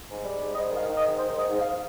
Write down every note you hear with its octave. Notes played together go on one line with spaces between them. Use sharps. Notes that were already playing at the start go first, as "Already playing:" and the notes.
G#2
G3
G#2
G#2 D#5
D#3 F5
D#3
D#5
G#2
D#3 C5
G#2 D#5
G#2
F5